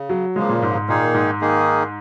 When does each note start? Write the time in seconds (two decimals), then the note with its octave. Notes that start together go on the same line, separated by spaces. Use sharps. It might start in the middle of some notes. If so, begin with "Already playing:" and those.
Already playing: C#3
0.09 F#3
0.36 C#3 F3 G#3 A#3
0.49 A#2
0.62 G#2
0.75 G#2
0.89 A#2 D#3 A#3 D#4 G#4
1.14 G#2
1.41 D#3 A#3 D#4 G#4